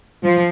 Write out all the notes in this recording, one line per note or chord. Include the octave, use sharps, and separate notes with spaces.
F3